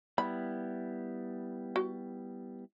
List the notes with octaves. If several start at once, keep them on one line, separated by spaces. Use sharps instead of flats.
G3 B3 E4 B5
F#4